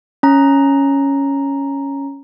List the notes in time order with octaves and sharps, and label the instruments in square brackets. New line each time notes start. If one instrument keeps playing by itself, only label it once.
[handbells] C#4 A#5